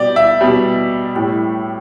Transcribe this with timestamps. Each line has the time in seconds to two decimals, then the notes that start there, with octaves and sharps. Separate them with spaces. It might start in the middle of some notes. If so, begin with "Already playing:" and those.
Already playing: B2 G3 G4 D5
0.16 E5
0.41 B2 G3
1.15 A2 G3